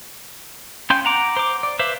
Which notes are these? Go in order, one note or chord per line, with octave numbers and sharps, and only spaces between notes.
C#4 F5 G5 C6 G6
F#5 A#5 D6
C5 D6
D5
B4 C5 E5 F5